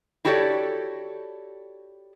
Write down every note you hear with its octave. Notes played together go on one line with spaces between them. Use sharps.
E4 F#4 G4 A4 C#5 D5